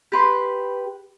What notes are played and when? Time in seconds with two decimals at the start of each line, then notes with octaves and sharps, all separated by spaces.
0.12 G4 B4 C6